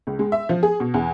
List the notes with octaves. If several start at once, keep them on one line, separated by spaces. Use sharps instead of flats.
C#2
G#3
E5
F3
G#4
B2
E2